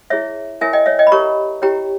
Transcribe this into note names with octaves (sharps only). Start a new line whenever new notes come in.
E4 G#4 C#5 E5
E4 A#4 C#5 E5 G#5
D#5 G5
C#5 E5
D#5 G5
B5
G4 A#4 C#5 A#5 C#6
E4 G4 C#5 G5 A#5